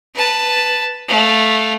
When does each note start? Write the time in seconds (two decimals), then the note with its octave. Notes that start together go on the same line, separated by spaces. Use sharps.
0.15 B4 A5
1.09 A3 F5